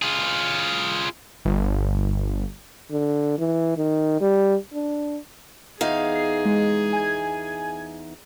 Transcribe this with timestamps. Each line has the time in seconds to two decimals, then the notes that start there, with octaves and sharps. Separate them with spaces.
0.02 F4 G#4
1.45 G1
2.91 D3
3.39 E3
3.77 D#3
4.21 G3
4.74 D4
5.81 E2 D#4 G#4 F5
6.15 C7
6.45 G#3
6.93 G#5 G#6